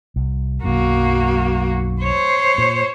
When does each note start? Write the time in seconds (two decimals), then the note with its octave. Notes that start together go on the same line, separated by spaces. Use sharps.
0.16 C2
0.63 B1 F#2 A#3 F#4
2.02 C5 C#5
2.58 A#2